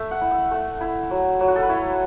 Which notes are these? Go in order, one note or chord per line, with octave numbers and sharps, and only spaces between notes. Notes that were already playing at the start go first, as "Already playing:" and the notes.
Already playing: A3 E5
F#5
E4
E5
A3
E4
F#3
F#3
F#4
A4
B4
E4 C#5